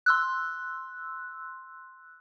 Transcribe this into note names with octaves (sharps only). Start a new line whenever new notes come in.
C6 E6 F#6